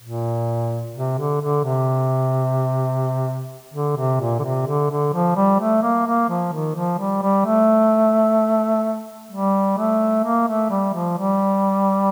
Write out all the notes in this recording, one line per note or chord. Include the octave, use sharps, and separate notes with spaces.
A#2
C3
D3
D3
C3
D3
C3
A#2
D3
C3
D3
D3
F3
G3
A3
A#3
A#3
F3
D#3
F3
G3
G3
A3
G3
A3
A#3
A3
G3
F3
G3